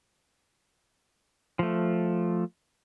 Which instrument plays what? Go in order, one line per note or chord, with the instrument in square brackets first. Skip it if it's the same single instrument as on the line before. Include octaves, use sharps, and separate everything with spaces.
[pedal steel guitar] F3 A3